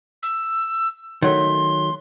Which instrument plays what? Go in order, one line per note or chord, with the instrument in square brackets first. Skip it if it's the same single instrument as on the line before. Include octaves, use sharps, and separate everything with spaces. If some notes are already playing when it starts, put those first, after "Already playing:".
[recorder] E6
[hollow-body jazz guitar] D#3 F#3 A3 [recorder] C6